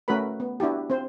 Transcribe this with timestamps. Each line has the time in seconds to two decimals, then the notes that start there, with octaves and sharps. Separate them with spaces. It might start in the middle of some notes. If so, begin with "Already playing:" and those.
0.08 A3 C#4 F#4 A#4 B4 B5
0.40 B3
0.60 D4 E4 F#4 G4
0.90 C4 C5